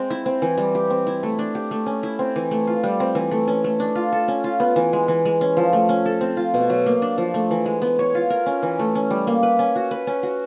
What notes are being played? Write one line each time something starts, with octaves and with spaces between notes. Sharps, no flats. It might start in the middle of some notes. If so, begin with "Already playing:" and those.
Already playing: G#3 C4
E4
C4
E3
G3
G4
C4
E4
A3
D4
G4
A3
C#4
E4
C4
E3
A3
F4
G3
C4
E3
A3
C#4
A3
D4
F4
A4
C#4
F4
B3
E3
G#3
E3
G#3
C#4
F3
A3
C#4
A4
C4
F4
B2
F#3
A#3
D4
F3
A3
E3
G#3
B3
C#5
F4
A#4
C#4
E3
A3
C#4
G3
A#3
B4
C#4
F#4
B4
C#4
F#4